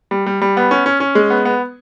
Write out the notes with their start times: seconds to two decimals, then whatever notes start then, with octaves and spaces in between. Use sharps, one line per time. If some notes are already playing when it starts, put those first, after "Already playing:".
0.11 G3
0.26 G3
0.41 G3
0.57 B3
0.71 C#4
0.86 C#4
1.00 C#4
1.15 G#3
1.30 B3
1.45 B3